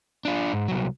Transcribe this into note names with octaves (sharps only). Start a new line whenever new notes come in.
D4 F4
G#2
C2 F#3